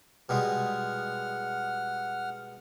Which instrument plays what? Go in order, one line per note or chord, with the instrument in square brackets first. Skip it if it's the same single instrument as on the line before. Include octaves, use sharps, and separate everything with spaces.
[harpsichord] B2 G3 G#3 [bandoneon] F#5 F6